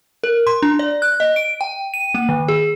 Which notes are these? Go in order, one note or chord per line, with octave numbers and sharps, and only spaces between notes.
A#4
C6
D4
D5
F#6
D#5
D7
G5
D#7
A#3
D#3
G#4